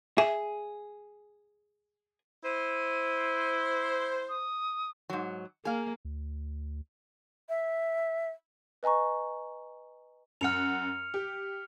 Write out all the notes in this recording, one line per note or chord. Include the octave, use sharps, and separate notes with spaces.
G#4 E5
E4 C5 D#7
D#6
G#2 F#3
A#3 G#4 F5
D2
E5
B4 D#5 G#5 A#5 C#6
F#2 F#5 F6 C#7 F7
G4